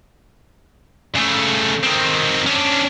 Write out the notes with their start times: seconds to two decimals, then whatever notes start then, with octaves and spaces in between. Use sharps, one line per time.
1.15 C#3 A3
1.83 D#3 C4
2.46 C#4 D4